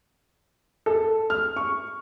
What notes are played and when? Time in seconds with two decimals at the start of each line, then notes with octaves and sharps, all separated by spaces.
0.86 A4
1.30 F6
1.56 C#6